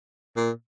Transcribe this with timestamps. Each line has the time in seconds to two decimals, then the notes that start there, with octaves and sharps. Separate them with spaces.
0.37 A#2